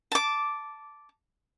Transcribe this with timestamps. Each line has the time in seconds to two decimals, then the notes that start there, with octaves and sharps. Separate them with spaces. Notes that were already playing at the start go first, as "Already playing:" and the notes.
0.12 A5 D6